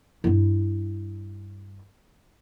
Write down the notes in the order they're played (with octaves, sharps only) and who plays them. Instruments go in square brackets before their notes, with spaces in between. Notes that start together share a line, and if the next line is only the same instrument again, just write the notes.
[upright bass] G2 E4